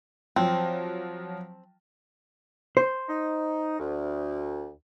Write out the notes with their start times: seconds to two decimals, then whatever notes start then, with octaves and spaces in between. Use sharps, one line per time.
0.36 F3 F#3 C4
2.77 C5
3.09 D#4
3.79 D2